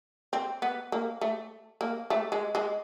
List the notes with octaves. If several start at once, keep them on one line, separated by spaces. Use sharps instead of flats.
C4
B3
A#3
A3
A#3
A3
G#3
G#3